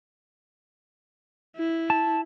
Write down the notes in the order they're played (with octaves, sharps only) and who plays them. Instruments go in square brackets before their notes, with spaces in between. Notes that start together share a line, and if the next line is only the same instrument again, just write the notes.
[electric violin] E4
[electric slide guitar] A5